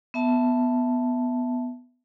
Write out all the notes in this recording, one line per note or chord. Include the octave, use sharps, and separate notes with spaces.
B3 E5 A5